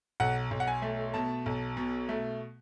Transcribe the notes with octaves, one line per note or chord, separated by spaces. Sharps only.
B1 F#5
B1
F#5
G#5
A3
B2 A5
B1
B2
A3